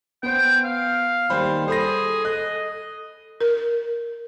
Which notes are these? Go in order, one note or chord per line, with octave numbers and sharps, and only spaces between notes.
B3 C5 G5
F5
D#2 G3 C5 B5
G#4 A4 C5 B5 A#6
D#5 F#6
A#4